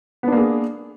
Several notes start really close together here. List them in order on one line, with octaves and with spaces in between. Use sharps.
B3 D4 A#3 G#4